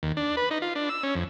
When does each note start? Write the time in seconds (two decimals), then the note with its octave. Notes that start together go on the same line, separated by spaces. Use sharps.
0.03 D#2
0.17 D4
0.37 B4
0.51 D#4
0.62 F4
0.75 D4
0.89 E6
1.03 C#4
1.15 F2